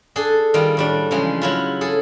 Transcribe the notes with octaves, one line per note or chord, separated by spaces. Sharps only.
D4 G#4 A4
D#3 G3 F4
A2 G3 D4
C#3 E3 F3 G#3
F#3 E4 F4
G#4 A4